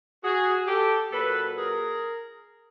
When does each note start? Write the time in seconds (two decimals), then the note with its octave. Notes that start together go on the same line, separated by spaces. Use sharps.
0.24 F#4 G#4
0.67 G4 A4
1.12 A#2 F#3 A4 B4
1.56 G#4 A#4